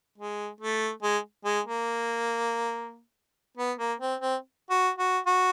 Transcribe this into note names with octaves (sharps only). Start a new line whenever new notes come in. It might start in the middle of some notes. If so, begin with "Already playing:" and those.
G#3
A3
G#3
G#3
A#3
B3
A#3
C4
C4
F#4
F#4
F#4